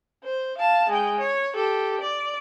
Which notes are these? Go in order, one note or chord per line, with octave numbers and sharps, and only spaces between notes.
C5
F5 A5
G#3 G5
C#5
G4 A4
D5